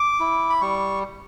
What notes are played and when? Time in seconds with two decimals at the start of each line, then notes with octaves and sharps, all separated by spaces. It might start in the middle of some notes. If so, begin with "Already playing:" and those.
Already playing: D6
0.20 E4
0.50 B5
0.61 G3 C#6